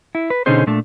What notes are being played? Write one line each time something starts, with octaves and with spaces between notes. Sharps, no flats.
E4
B4
B2 D3 C#4 D#4 G#4 C5
A#2 A3 D4